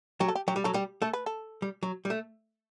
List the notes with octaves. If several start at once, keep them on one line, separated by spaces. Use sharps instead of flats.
F#3 G4
A4
G4
F#3 G4
G3
F#3 A4
G3 G4
A3 A4
B4
A4
G3
F#3
G3
A3